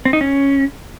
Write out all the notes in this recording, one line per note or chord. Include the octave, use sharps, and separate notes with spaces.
C4
D#4
C#4